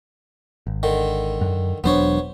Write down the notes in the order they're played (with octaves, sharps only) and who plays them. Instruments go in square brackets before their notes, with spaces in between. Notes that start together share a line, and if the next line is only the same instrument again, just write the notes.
[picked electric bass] G#1
[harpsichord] D3 D#3
[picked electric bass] F#2
[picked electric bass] E1 F#3 D4 [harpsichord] B3 C5 C#5